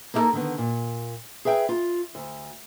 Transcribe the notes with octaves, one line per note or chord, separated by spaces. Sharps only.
A#3 D#4 E4 F#4 A4 A#4
D3 D#3 B3
A#2
G#4 B4 E5 G5
F4
D2